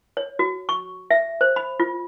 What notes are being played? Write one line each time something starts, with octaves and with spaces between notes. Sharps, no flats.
C#5
F#4
C#6
E5
C5
B5
F4